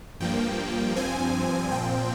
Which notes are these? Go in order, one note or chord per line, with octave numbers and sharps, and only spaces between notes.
G2 F3 A#3 G5
G2 F3 C4 G#5
A#2 F3 C4 G5